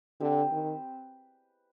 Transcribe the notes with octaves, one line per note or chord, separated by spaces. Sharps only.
D3 C4 G4 B4
D#3